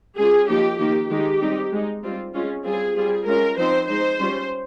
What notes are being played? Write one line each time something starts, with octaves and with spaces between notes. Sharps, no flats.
G#3 C#4 F4 G#4
F3 A#3 D#4 G4
D#3 A#3 D#4 G4
D#3 G#3 D#4 G4
G3 C4 D#4
G#3 D#4
G3 C4 F4
G#3 C#4 F4
G3 C4 F4 G#4
G3 C4 F4 G#4
G#3 C#4 F4 A#4
F3 C4 D#4 C5
G#3 D#4 C5
G3 C#4 F4